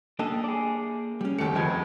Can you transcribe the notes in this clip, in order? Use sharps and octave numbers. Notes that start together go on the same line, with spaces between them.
A#3 D4 G4 A4 D#5
G#4 D5
G3 C#4
F#1 D#2 A3 G4 C#7
F#1 F2 F3 G#3 B3 G#6